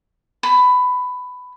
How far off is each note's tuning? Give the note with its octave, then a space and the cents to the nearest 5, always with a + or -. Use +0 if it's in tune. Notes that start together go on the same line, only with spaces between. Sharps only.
B5 +15